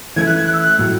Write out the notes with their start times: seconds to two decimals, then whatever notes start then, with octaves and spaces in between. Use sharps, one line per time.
0.16 E3 A3 C#4 E4 G#6
0.27 F#6
0.37 G#6
0.45 F#6
0.53 E6
0.60 F#6
0.79 A2 F#3 A3